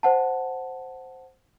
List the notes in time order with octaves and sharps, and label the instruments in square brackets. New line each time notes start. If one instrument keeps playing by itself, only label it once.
[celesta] C5 F#5 A5